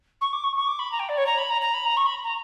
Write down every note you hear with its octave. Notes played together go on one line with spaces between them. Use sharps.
C#6
D6
C#6
C#6
D6
B5
A#5
G5
D5
C#5
A#5
B5
A#5
A#5
B5
A#5
C#6
B5
A#5